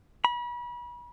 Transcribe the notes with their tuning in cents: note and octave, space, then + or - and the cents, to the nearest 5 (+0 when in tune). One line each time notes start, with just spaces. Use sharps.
B5 -35